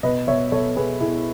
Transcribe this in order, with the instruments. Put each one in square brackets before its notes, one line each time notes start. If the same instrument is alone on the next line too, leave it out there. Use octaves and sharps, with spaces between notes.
[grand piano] B2 B4 D#5
B2 C#5 E5
B2 A4 C#5
B2 G#4 B4
B2 E4 G#4